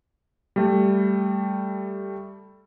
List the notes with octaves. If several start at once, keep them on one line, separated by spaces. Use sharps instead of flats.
G3 A3